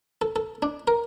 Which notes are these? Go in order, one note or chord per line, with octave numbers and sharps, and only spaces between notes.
A4
A4
D4
A#4